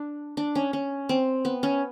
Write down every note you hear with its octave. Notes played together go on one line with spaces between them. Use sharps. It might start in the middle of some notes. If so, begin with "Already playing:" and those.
Already playing: D4
D4
C#4
C#4
C4
B3
C#4